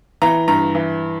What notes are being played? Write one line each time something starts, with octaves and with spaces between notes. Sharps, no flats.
E3 A#5
G2 A#5
E3